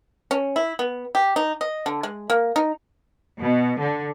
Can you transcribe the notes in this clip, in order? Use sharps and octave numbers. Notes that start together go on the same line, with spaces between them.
C#4
E4
B3
G4
D#4
D#5
D3
G#3
A#3
D#4
B2
D3